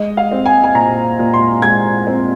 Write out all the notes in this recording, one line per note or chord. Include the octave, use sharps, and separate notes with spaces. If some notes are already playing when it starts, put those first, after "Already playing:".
Already playing: G#3 D#5
F5
C4
G#5
G#5
A#2 A#5
A#2
C6
G#3 G#6
C4